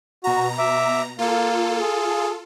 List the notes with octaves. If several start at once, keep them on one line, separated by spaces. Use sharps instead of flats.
B2 F#4 A#5
E5 D6
A#3 F4 A4
G#4